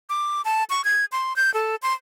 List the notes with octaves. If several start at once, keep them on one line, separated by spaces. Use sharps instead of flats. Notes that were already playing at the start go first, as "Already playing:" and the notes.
D6
A5
C#6
G#6
C6
G6
A4
C6